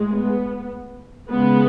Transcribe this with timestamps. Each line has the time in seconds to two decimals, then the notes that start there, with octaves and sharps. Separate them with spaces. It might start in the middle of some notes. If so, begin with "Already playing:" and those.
Already playing: A2 G#3
0.11 B3
1.29 C#3 G#3 B3